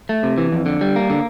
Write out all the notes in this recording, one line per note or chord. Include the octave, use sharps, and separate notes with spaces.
A3
C3
E3
F2
D3
G3
A#3
D3